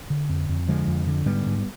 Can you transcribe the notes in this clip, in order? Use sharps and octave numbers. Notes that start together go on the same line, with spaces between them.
D3
F2
F2
D3 F3 G#3
F2
D3
G#2 G3 B3
G#2